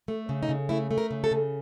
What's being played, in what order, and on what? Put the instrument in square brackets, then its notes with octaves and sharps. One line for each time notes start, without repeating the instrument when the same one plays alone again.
[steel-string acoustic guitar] A3
C#3
D#4
C#3
A3 E4
A3
A#4
C#3
A4
C#3